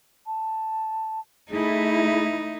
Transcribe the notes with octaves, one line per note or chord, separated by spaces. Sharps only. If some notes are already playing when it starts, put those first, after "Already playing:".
A5
A3 D#4 E4 G#4